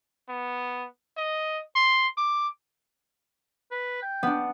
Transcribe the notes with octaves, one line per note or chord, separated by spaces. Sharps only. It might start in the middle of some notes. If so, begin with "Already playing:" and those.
B3
D#5
C6
D6
B4
G5
B3 D4